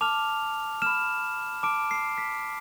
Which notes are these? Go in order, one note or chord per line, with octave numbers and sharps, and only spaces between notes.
A5 D6 F6 F7
B5 F6 E7
A5 D6 F6 D7
C7
B6